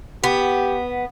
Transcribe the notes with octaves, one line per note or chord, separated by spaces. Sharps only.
B3 G4